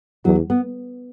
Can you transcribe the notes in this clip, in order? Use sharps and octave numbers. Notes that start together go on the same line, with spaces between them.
E2 F#3
B3